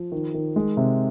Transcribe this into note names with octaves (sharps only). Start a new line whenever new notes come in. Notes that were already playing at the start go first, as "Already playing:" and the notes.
Already playing: F3
D#3
D#3
G#3
C3